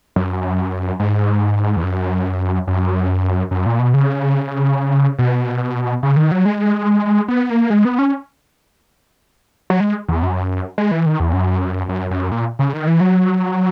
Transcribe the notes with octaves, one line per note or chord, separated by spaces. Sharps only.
F#2
G#2
E2
F#2
F#2
F#2
A#2
B2
C#3
B2
C#3
D#3
F#3
G#3
B3
A#3
G#3
B3
C#4
F#3
G#3
E2
F#2
G#3
E3
D#3
E2
F#2
F#2
F#2
A#2
C#3
D#3
E3
F#3